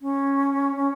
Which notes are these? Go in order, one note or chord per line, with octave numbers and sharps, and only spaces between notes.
C#4
C#4